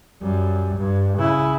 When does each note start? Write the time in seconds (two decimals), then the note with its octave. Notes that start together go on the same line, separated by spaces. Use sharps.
0.22 F#2 G3
0.77 G2
1.19 C#3 E4